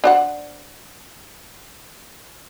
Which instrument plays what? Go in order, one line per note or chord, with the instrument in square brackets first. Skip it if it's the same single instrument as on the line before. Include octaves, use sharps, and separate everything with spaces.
[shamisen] D4 C5 F#5